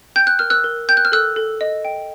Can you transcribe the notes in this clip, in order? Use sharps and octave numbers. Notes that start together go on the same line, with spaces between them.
G5 G6
F#6
A#4 F6
E6 F#6
A#4
G5 G6
F#6
F6
A4 E6 F#6
A4
D#5
G5